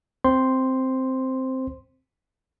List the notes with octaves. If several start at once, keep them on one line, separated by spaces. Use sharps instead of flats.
C4 C5 C6